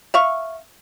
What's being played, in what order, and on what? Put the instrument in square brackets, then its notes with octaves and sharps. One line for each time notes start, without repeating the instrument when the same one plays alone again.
[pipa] E5 F5 C#6